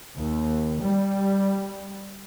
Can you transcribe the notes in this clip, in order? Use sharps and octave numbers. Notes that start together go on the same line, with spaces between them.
D#2
G3